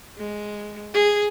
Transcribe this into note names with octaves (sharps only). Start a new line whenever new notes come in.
G#3
G#4